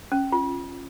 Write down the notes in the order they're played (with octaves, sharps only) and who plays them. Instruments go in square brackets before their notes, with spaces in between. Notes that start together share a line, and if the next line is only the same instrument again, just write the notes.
[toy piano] C#4
F4